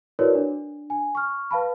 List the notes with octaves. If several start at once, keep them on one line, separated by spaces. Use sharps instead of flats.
E4 F#4 A#4 B4 C#5 D5
D4
G#5
C#6 F6
B4 F5 A5 B5